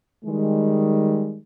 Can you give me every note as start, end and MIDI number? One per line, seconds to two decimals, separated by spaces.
0.24 1.38 51
0.24 1.38 55
0.24 1.38 56